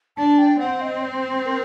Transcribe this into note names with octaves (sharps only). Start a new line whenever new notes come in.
D4 A5
G5
C4 F#5
D#5
C5
A#4